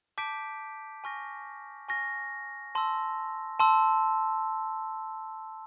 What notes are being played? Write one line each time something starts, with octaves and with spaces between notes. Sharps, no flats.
A5 D6 G6 B6 D7
G#5 C#6 F6 A#6
G#5 C#6 F6 A#6
A5 C6 E6
A5 C6 E6